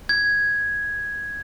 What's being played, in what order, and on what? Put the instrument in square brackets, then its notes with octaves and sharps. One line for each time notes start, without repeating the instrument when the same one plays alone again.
[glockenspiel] G#6